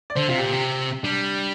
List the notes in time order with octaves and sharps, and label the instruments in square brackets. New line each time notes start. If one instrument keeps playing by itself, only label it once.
[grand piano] D5
[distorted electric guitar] D3 [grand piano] C5
[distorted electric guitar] C3 [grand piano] F4
[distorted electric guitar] A#2 [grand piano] G4
[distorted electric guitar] C3
[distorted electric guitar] G3 [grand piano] D4